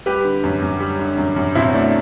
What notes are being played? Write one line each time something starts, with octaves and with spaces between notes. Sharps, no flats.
G3 G4 B4
D3
F#2
F#2
G3
D3
F#2
F#2
B2 C4 E4
A3 D4